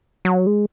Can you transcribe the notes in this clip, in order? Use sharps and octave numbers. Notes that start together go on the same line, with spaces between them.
F#3
G#3